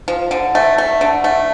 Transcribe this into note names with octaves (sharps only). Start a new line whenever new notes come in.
F3
D3
A3
A3
D3
A3